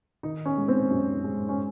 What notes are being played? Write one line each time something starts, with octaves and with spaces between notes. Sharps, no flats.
D#3 D#4
C#4
G#3
C4
F#2 C#4
G#3
C#4